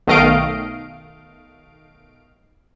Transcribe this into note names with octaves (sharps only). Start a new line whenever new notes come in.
B1 D#3 A3 D#5 F5 D7